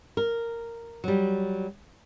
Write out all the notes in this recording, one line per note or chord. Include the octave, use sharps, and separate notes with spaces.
A#4
F#3 G3